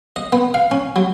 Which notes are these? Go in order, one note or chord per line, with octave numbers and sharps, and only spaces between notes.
D#5
B3
F5
C#4
F#3